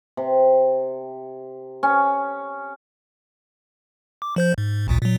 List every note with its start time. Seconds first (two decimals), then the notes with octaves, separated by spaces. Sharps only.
0.17 C3
1.83 C#4
4.22 D6
4.36 F3 C5 G6
4.58 G#2
4.88 A1 D2 A#2
5.02 A#2 F#3